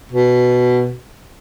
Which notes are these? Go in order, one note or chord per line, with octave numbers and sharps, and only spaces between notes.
B2